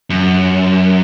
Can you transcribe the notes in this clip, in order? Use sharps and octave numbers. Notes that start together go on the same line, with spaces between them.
F#2